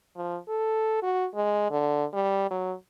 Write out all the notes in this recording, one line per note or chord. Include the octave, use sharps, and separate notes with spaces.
F3
A4
F#4
G#3
D3
G3
F#3